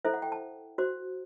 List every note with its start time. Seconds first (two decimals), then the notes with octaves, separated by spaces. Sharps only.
0.05 E4 A4 C5 E5
0.14 F#5
0.22 G5
0.32 A5
0.78 F#4 C5